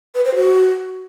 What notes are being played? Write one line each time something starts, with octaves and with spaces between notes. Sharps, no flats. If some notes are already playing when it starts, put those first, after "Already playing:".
B4
C5
F#4